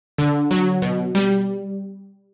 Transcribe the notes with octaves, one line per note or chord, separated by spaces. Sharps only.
D3
F#3
B2
G3